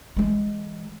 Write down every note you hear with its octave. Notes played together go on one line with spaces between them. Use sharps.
E3 G#3